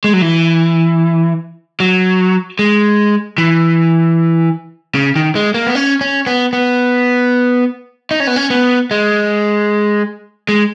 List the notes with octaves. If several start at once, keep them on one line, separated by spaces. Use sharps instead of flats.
G#3
F#3
E3
F#3
G#3
E3
C#3
D#3
G#3
A#3
B3
C#4
C#4
B3
B3
D#4
C#4
B3
C#4
B3
G#3
G#3